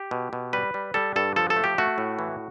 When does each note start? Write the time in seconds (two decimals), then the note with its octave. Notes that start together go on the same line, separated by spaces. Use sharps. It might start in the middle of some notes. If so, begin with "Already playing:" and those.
Already playing: G4
0.11 B2
0.33 B2
0.53 G3 B4
0.74 G3
0.94 G3 A4
1.16 G2 A4
1.36 F3 A4
1.50 A4
1.57 A3
1.64 G4
1.78 A3 F#4
1.98 A2
2.19 E3